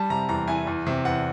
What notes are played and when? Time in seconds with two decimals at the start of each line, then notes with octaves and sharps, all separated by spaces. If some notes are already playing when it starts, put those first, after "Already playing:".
Already playing: G3 A5
0.10 C3 A#5
0.29 E2 A#5
0.48 E3 G#5
0.67 E2
0.87 C3
1.05 E2 F#5